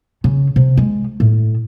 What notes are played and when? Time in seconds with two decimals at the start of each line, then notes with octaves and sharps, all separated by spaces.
0.24 C#3
0.56 C3
0.77 G#3
1.20 A2